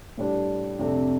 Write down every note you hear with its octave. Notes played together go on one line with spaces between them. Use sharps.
A2 G3 D4 G4
F2 C3 A3 D4